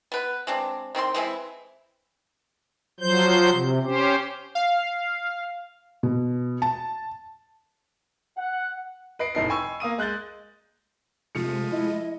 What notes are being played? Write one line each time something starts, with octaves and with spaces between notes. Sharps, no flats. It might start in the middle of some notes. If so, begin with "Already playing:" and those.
B3 B4
G#3 C4 D4
D#3 C4 E4 C6
E3 G#3 C4 E4
F3 F#3 C5 G6
C3
C#4 G4 C5
F5
B2
A5
F#5
B4 D#5 C7 D7
F1 A2 D#4 A4 C7
G5 G#5 B5 C#6 E6
A#3 F5 D#6 D#7
G#3 F#6 G6 A6
C3 F3 G#3 A3 C#7 D#7
E4 D#5